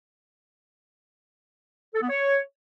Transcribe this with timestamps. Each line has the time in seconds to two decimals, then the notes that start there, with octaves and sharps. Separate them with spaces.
1.94 A4
2.02 B3
2.09 C#5